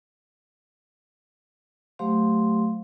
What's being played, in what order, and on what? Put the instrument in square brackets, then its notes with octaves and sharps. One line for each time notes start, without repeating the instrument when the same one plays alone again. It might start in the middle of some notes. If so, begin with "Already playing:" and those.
[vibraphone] F#3 A3 G4 C5 F5 C6